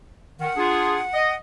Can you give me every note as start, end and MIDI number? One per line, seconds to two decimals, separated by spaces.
0.40 0.50 51
0.40 1.36 78
0.57 1.01 62
0.57 1.01 65
0.57 1.01 68
1.14 1.32 75